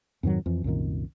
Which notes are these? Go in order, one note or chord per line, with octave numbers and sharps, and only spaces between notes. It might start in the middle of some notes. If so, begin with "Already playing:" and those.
F2 G#2 D#3 F#3
F2 E3
C2 F#2 A#2 D#3